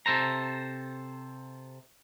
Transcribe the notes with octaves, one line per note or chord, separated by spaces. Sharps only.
C3 A4 C5 A#5